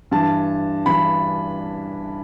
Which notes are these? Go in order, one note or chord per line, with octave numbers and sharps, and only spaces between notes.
G2 E3 A5
G2 E3 B5